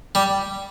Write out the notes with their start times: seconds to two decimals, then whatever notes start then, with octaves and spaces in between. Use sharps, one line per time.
0.15 G3